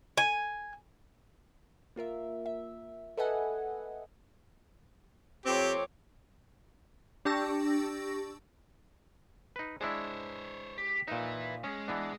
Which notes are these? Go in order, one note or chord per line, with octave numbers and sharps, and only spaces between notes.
G#5
A#3 F4 A#4 E5
E5
A4 B4 D#5 E5 F#5 G#5
F2 C4 G4 C#5 D6
D4 G4 A5 C#6 E6 A#6
D#4 B4
G#3 D4 E4 C5 C#5
G4
A#2 D#4 B4 E5
G#3 C#4 G#4
E3 B3 D4